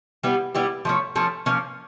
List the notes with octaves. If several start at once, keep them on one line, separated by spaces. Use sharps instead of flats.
G3 B3 E4 G4
G3 B3 E4 G4
F3 A3 C#4
F3 A3 C#4
F3 A#3 C#4